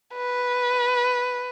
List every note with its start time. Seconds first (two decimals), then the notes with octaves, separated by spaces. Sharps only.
0.14 B4